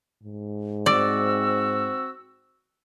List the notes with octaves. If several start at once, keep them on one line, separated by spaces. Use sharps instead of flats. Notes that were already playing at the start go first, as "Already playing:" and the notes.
G#2
C4 F#4 D5 E6